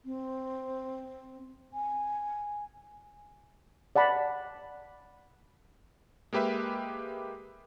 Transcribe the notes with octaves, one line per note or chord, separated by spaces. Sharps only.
C4
G#5
D5 F#5 A5 B5
G#3 A#3 G4 B4 E5